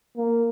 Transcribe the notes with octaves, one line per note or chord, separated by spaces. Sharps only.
A#3